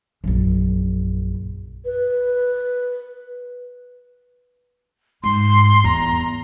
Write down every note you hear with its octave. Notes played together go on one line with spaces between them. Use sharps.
A#1 F#2
B4
G#2 C6
E2 A#5